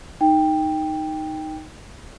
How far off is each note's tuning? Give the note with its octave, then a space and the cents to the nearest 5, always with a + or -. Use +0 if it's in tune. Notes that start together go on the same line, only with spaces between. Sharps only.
D#4 +0 G5 +10